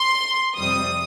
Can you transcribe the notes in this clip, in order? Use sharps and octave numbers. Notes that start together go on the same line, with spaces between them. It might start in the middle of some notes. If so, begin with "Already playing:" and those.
Already playing: C6
F2 C3 G3 D#6